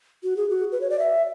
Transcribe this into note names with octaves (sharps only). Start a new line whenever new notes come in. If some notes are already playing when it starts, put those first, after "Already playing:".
F#4
G#4
F#4
B4
C#5
D5
E5